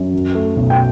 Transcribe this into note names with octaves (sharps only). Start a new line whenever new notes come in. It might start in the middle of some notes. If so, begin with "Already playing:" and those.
Already playing: F#2
F#3
A3
B1
G5